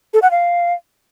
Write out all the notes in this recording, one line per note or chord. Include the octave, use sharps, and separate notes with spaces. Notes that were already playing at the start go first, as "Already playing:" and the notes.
A4
F#5
F5